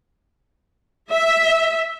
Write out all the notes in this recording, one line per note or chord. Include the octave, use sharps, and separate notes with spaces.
E5